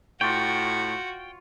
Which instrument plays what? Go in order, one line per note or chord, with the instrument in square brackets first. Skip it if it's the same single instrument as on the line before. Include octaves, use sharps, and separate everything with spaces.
[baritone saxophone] A2 [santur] F4 C#5 [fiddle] F#4 [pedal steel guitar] G5